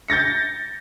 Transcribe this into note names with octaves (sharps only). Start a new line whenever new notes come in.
G6 A6 A#6 C#7